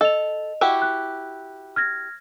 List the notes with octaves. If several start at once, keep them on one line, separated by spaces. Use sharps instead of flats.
A4 D#5 F7
E4 F#4 G4
F#6
F6 G#6 A#6